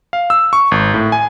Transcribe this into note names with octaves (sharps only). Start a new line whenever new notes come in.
F5
E6
C#6
G#1
A2
G#5